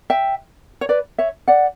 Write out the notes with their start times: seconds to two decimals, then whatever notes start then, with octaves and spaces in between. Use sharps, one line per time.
0.10 E5 G5
0.81 C#5
0.89 B4 D5
1.18 C#5 E5
1.48 D5 F#5